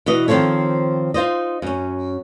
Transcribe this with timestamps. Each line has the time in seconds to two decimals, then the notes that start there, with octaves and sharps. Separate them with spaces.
0.06 B2 E3 D#5
0.28 D#3 F3 C4 A4 C#5
1.14 D#4 F4 C5 D#5
1.62 F#2 C#4